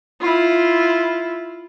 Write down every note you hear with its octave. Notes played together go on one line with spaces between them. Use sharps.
E4 F4